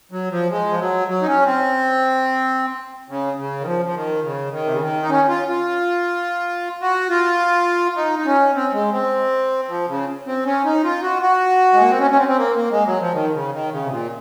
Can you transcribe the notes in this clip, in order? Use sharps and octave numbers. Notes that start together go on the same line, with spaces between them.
F#3
F3
G#3
F3
F#3
F#3
D#4
C#4
C4
C#3
C#3
D#3
F3
F3
D#3
C#3
D#3
C3
C#3
D#3
D#4
C#4
F4
F4
F#4
F4
D#4
D#4
C#4
C4
G#3
C4
F3
C#3
C4
C#4
D#4
F4
F#4
F#4
G#3
A#3
C4
C#4
C#4
C4
C4
A#3
A#3
G#3
F#3
F3
D#3
C#3
D#3
C#3
C3
A#2